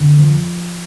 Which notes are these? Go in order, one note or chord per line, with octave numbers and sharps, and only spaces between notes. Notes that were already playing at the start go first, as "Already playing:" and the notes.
Already playing: F2 D3
F3